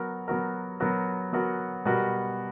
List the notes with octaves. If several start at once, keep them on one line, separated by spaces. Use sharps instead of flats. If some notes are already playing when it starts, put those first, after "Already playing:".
Already playing: F#3 B3 F#4 A#4
F#3 B3 F#4 A#4
F#3 B3 F#4 A#4
F#3 B3 F#4 A#4
B2 G3 B3 F#4 A#4